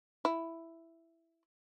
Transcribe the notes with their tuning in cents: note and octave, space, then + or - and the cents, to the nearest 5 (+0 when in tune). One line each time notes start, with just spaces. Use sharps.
E4 +5